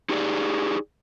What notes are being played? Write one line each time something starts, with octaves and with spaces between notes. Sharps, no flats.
D#4 G4 G#4 C#5 D5